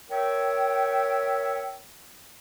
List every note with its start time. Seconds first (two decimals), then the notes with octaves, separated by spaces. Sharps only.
0.10 A#4 C#5 E5 G5